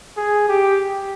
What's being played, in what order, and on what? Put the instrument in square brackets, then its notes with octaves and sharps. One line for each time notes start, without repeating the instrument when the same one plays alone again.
[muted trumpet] G#4
G4